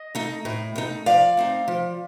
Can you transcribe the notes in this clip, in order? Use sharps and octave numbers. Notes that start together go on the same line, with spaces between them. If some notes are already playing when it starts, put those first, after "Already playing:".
Already playing: D#5
A3 D#4
A2
A3 D#4
F3 D5 F5
A3 C4 D#4
F3